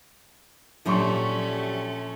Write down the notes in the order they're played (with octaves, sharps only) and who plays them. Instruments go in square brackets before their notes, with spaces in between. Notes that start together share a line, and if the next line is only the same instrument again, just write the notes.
[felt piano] A#1 C6 C#6 [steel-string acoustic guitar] F#3 G4 D5 [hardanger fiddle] A3 C#4